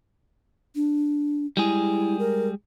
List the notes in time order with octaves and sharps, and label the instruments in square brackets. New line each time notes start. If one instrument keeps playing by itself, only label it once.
[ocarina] D4
[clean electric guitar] G3 G#3 G#4 [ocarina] E4
[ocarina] A#4